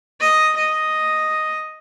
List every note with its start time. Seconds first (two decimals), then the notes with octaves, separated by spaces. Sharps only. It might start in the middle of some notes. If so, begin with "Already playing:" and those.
0.20 D#5
0.56 D#5